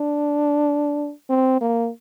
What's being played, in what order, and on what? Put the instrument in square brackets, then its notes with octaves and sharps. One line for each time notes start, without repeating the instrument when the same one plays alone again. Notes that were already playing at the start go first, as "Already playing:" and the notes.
Already playing: [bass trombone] D4
C4
A#3